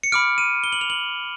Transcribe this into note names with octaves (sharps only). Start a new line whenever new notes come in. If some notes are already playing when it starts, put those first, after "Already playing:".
C#7
B5 D6 F6 D7
D#7
G7
F#7
F7
F#7